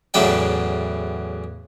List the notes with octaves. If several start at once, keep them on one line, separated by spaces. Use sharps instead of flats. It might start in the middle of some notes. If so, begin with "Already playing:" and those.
E2 A2 C#3 F#3 D5 G5